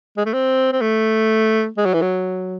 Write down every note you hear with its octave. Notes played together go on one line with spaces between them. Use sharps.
G#3
A3
C4
C4
A3
G#3
F#3
E3
F#3